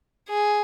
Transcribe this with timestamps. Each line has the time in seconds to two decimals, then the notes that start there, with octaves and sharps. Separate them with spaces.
0.29 G#4